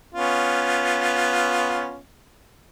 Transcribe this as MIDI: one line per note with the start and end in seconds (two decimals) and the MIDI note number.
0.15 1.97 59
0.15 1.97 61
0.15 1.97 65